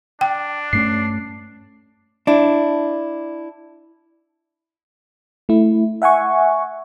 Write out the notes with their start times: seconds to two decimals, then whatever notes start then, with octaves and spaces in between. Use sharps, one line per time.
0.21 D4 G5
0.73 G2 A3 C#4 C7
2.27 D4 E4
5.49 A3 E4
6.02 E5 F#5 G#5 C#6